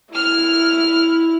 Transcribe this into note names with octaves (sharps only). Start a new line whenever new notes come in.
E4 F6